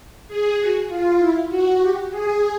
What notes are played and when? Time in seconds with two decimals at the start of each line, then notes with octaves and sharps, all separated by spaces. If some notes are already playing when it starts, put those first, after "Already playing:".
0.28 G#4
0.59 F#4
0.89 F4
1.19 E4
1.49 F#4
1.81 G4
2.11 G#4